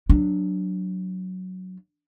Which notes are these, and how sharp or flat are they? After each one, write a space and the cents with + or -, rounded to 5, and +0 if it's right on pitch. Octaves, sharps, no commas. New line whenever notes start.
F#3 +0 D4 +0